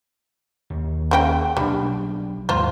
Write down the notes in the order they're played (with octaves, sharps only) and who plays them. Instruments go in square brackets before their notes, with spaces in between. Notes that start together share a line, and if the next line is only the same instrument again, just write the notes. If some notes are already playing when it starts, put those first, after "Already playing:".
[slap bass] D#2
[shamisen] C#3 C4 G5
[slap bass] B1 D4 [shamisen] G3
[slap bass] D#2 G#2 [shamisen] F4 C5